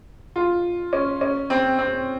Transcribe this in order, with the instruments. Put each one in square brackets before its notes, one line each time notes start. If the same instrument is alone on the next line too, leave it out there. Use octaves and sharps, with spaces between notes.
[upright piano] F4
C#4
C#4
C4
C4